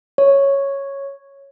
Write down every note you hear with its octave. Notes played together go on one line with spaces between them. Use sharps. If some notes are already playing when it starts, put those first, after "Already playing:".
C#5